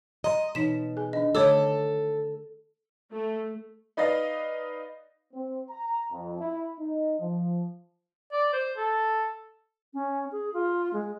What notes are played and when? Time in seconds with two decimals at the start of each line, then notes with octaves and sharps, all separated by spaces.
0.24 D#5 A#5 C6
0.55 B2 E3 D#4 B6 E7
0.97 G#4 G#5
1.13 D#3 D4 D#5
1.35 D3 A3 A4 C#5 D6 E6
3.12 A3
3.97 D#4 B4 D5 D#5 F5
5.34 C4
5.70 A#5
6.11 F2
6.39 E4
6.79 D#4
7.19 F3
8.33 D5
8.53 C5
8.77 A4
9.93 C#4
10.31 G#4
10.53 F4
10.93 G#3